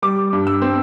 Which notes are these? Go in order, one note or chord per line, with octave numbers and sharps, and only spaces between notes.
G3 D6
G2
E6
C4